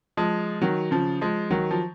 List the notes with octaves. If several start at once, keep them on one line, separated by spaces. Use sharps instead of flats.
F3 G#3
D#3 F#3
C#3 F3
F3 G#3
D#3 F#3
F3